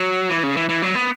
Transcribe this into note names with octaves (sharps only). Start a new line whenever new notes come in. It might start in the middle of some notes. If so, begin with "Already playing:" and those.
Already playing: F#3
E3
C#3
E3
E3
F#3
B3